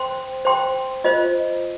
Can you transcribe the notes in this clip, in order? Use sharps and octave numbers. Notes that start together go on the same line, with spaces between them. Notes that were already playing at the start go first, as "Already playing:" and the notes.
Already playing: C5 G5 C6
C5 G5 C6
F4 C5 D#5